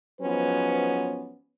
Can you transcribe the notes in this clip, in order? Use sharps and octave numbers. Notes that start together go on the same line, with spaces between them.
G#2 F3 F#3 B3 C#4 B4